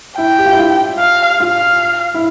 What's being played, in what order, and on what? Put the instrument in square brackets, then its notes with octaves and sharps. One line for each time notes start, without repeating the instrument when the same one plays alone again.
[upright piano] E4 [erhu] G5
[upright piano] G4
F4
E4
F4
[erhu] F5
[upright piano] F4 [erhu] F5
[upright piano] E4